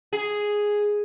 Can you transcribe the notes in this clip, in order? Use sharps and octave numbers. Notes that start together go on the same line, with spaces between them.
G#4